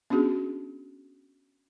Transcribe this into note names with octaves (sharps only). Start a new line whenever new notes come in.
B3 C#4 D4 F#4 G#4